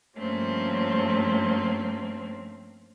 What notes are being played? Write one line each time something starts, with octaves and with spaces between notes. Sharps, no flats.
G2 F3 A3 A#3 C4 C#4